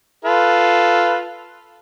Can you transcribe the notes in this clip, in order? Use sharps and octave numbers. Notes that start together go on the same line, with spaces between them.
F4 A4 B4